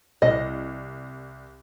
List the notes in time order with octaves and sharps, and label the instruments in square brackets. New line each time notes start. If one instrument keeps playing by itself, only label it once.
[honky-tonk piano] C2 [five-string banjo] D#5